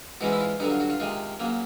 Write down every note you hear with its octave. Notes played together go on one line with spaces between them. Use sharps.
G#2 E3 G#3 C#4 F#4
E4
F4
G2 D3 F#3 D#4
F4
F#4
F4
C3 D#3 G#3 F4
C#3 F#3 A#3